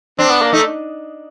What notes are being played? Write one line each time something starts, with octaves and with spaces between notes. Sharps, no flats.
C4 D4
B3
A#3
A3 D#4